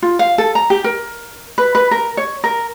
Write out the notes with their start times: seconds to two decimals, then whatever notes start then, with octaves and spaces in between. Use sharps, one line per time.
0.02 F4
0.19 F5
0.38 A4
0.55 A#5
0.70 G4
0.84 A#4
1.58 B4
1.75 B4
1.91 A#4
2.17 C#5
2.44 A#4